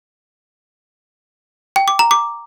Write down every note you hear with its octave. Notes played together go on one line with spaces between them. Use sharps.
G5
D6
A#5
D6